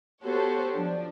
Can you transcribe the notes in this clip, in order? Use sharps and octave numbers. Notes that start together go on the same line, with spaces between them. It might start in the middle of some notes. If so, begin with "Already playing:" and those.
B3 F#4 G4 A4 C5 C#5
F3 D4